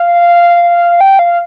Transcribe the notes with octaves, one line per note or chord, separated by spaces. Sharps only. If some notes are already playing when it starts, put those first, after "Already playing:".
Already playing: F5
G5
F5